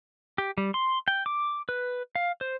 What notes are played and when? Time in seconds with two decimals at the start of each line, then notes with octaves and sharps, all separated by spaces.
0.38 G4
0.58 G3
0.74 C6
1.08 G5
1.26 D6
1.69 B4
2.15 F5
2.41 C5